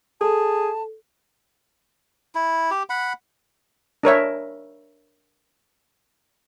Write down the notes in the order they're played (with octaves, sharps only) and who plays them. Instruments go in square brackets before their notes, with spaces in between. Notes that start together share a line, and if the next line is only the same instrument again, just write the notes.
[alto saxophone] G#4 [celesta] A4 [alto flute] A5
[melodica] E4
G4
F#5 B5
[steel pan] D4 A#4 C#5 E5